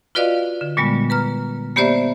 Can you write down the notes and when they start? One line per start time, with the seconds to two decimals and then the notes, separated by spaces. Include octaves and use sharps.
0.15 F4 F#4 B4 D5 D#5 F5
0.61 D3
0.77 A#2 G3 G#3 B3
1.10 B4 A#5 F6
1.76 A#3 B3 G4 C5 D5 E5